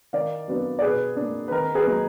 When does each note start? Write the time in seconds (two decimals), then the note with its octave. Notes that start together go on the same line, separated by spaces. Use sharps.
0.13 D#3 D5 F5
0.48 F#3 B3 D4
0.79 D5
0.82 B2 G#4 B4
1.17 D4
1.22 A#3
1.48 B4
1.51 D#3 A#4
1.74 G#4 B4
1.86 F#3 A#3 D#4